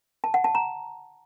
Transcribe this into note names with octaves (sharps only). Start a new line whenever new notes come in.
A5
F#5
A5
A#5